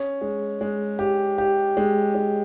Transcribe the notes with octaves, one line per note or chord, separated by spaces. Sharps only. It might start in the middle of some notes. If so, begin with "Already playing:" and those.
Already playing: C#4
G#3
G#3
G4
G4
G#3
G#3